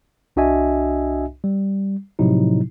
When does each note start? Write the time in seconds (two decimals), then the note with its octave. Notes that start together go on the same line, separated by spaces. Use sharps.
0.36 C2 D4 F#4 D#5 E5 G#5
1.44 G3
2.19 A2 C3 F3 F#3 D#4 E4